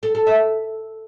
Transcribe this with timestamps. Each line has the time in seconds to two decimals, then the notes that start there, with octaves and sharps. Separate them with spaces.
0.03 A4
0.15 A4
0.27 E5